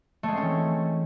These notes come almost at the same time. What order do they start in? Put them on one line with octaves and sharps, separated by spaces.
A3 G#3 C4 C#4 E3